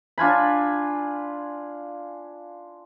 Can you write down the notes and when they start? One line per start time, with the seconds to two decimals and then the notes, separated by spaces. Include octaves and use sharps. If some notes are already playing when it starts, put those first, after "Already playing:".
0.18 D4 F4 G#5 B5